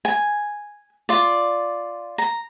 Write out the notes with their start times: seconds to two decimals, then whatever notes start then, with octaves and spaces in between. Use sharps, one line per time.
0.05 G#5
1.09 F4 D5
2.18 A#5